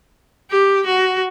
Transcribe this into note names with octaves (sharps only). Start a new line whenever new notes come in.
G4
F#4